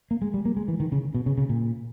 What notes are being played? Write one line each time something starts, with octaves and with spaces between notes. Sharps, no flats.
A#3
G#3
G3
A#3
G#3
E3
D#3
C#3
B2
C#3
C#3
A#2